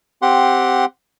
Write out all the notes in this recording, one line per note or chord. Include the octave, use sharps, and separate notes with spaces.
C4 G4 F#5 C6